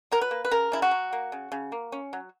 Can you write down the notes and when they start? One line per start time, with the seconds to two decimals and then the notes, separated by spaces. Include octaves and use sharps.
0.11 F#3 A#4
0.21 B4
0.31 A#3
0.45 B4
0.51 C#3 A#4
0.72 C#3 E4
0.82 F#4
0.91 F#3
1.13 A#3
1.32 C#3
1.52 C#3
1.72 A#3
1.92 C#4
2.13 F#3